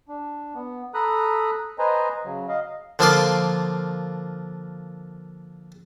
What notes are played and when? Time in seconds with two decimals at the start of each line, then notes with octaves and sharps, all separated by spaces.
0.08 D4
0.55 B3
0.94 A4 A#5 B5 D#6 F#6
1.79 B4 C5 D#5 G#5 A#5
2.25 C#3 F#3
2.48 D#5 F5
2.99 D3 F3 A#3 F4 D5 C6